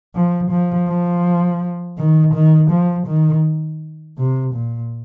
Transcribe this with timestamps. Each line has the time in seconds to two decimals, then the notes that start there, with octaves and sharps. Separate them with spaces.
0.15 F3
0.51 F3
0.88 F3
1.98 D#3
2.34 D#3
2.71 F3
3.07 D#3
4.18 C3
4.55 A#2